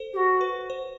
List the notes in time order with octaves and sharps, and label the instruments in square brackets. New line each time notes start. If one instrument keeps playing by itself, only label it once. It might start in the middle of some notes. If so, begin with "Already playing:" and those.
Already playing: [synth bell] A4 C5
[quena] G4
F#4
[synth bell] B4
C5